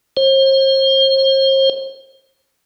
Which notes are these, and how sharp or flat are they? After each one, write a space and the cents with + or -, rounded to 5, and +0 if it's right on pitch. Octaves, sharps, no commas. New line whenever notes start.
C5 +40